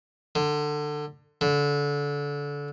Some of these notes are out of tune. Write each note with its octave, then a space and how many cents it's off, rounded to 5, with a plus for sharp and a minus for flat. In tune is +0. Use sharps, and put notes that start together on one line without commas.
D3 +20
D3 -25